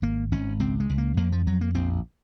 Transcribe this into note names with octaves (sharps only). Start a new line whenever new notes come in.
G#1 A#3
G#1 C#4
C#2 C4
G#3
C#2
A#3
F2 A#3
F3
F2 F#3
A#3
A#1 C4